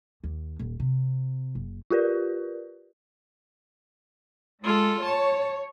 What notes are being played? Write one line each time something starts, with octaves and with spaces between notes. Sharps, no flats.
D#2
D#1
C3
F#1
F4 G4 A#4 B4 D5
G#3 F4 A4
C#5 A5